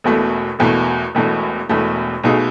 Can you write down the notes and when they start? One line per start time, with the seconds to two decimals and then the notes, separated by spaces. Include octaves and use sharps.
0.04 E1 E2 B2 A3
0.59 E1 E2 B2 A3
1.15 E1 E2 B2 A3
1.69 E1 E2 B2 A3
2.23 B1 B2 A3 D#4 G#4